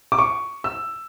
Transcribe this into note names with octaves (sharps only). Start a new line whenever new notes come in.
D6
C#6
E6